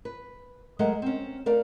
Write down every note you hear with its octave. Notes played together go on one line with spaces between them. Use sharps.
B4
F#3 G#3 A3 A#4 D#5 F#5
C4 C#4
A3 A#4 D5 F5